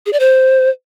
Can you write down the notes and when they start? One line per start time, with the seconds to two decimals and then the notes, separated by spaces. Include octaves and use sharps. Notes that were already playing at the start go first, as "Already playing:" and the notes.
0.06 G#4
0.13 D5
0.20 C5